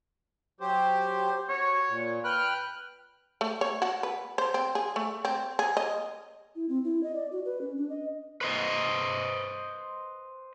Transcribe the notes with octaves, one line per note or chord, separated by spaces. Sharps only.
F#3 G4 C5
F#4 C#5
A#2
B4 G5 F6 F#6
A3
C#5
F#4
B4
C5
C4
G#4
A3
C4
G#4
D#5
E4
C4
E4
D#5
D5
F#4
B4
C#4
D4
D#5
B4 C5 D#5